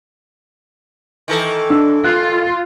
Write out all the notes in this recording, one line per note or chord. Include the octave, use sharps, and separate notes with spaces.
D#3 E3 A4
D4 E6
F4 F#6